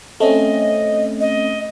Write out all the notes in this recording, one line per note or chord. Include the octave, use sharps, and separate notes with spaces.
A3 C4 C#4 D#5
D#5